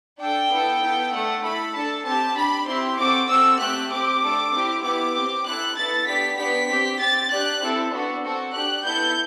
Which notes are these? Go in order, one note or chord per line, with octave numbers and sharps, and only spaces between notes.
D4 A4 G5
B3 E4 A4
B3 E4 A4
A3 D4 A4 F#5
A3 E4 A4 B5
D4 A4 A5
C4 G4 A5
D4 G4 B5
C4 E4 G4 C6
C4 F#4 A4 D6
C4 F#4 A4 E6
A3 C4 G4 F#6
C4 G4 D6
A3 D4 A4
C4 E4 G4
B3 E4 G4 D6
C4 G4
C4 E4 A4 F#6
B3 E4 A4 A6
B3 D4 G4 B6
B3 D4 G4 B6
C4 G4
C4 G4 A6
D4 G4 F#6
C4 E4 A4
B3 D4 F#4 A4
C4 F#4 A4
D4 G4 F#6
B3 E4 A4 G6